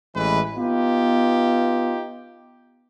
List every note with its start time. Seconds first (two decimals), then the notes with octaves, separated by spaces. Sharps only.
0.15 A1 E3 G#3 B4
0.56 B3 D#4 F4 G4